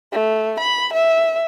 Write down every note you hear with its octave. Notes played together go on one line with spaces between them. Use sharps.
A3
B5
E5